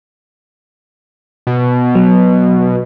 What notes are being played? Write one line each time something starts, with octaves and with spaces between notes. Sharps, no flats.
B2
F#3